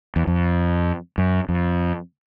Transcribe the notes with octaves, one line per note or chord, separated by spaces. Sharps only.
E2
F2
F#2
F2